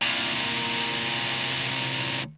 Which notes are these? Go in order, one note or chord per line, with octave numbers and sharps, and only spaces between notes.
C2 A#2